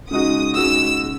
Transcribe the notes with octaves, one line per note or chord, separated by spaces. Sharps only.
C#3 G#3 D#4 F#4 D#6
C#3 G#3 D#4 F#4 E6
C#3